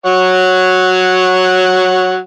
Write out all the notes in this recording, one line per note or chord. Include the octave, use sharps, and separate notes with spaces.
F#3 C#5 F#5